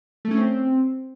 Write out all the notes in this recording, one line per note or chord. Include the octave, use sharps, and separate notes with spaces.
A3
C#4
C4